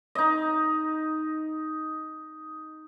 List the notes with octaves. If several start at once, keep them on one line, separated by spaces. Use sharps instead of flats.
D#4 D#5